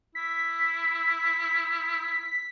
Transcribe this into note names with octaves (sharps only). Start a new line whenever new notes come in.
E4 B6